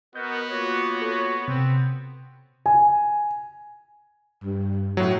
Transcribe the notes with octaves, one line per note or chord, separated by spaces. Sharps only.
B3 F#4 A#4 D#5 G6
A#3 F4 F#4 C#5
A4 C#5
C3 C4
G#5
G2
A2 F#3